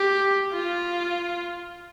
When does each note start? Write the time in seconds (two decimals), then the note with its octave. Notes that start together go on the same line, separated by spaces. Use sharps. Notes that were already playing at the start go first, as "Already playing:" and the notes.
Already playing: G4
0.52 F4